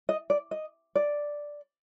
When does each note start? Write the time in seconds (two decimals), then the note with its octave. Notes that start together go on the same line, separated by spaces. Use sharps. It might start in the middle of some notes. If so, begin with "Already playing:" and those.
0.09 D#5
0.30 D5
0.51 D#5
0.95 D5